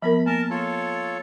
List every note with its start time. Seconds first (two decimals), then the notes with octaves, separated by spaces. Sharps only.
0.02 F3 B3 A#4 B5
0.26 A#3 A#4 A5
0.50 F4 A4 C#5